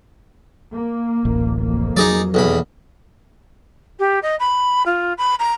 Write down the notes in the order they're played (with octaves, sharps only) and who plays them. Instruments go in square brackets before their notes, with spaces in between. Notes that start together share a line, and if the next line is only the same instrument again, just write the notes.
[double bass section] A#3
[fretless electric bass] D1 A1
[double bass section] F2 A#3
[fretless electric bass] F#3 [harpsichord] D#4 G#4 D5
[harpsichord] B1 E2 B5
[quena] G4
D#5
B5
F4
B5
A#5